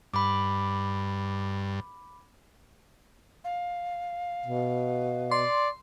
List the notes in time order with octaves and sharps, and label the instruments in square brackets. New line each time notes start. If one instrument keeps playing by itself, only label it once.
[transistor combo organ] G2 [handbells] B5 D6
[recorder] F5
[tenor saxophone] B2
[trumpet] D5 [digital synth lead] C6